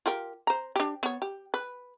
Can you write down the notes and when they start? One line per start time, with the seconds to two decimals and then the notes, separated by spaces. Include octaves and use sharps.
0.06 F4 G4 A#4
0.47 C5 A#5
0.76 D4 G4
1.03 B3 C#5
1.22 G4
1.54 B4